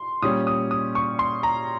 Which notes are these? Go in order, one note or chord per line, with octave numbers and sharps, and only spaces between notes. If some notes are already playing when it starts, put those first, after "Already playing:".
Already playing: C6
A#2 G3 C#4 D#6
D#6
D#6
C#6
C6
A#5